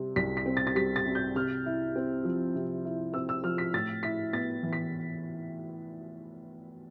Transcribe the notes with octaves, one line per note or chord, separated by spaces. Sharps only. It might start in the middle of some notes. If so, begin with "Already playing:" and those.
Already playing: C3 G3 C4
C2 B6
B6
C4
A6
A6
G3 B6
A6
C3
G6
C3 F6
E4
C4
F3
C3
E4
C4 E6
E6
F3 F6
B6
A2 A6
E4 B6
B3 A6
E3
B6